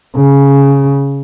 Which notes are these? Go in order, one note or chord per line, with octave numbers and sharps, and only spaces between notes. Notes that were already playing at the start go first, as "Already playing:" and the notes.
C#3